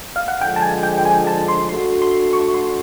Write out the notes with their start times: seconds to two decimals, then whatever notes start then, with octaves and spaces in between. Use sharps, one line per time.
0.16 F5
0.28 F#5
0.41 D3 F3 G#3 G5
0.56 A5
0.62 G#5
0.83 G5
0.98 G5
1.05 G#5
1.27 A5
1.48 C6
1.69 A3 D4 F#4 C6
2.02 C6
2.33 C#6
2.54 C6